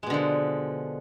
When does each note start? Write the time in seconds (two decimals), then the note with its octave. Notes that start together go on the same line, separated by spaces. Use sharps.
0.03 G#3
0.06 B2
0.10 D3
0.14 F3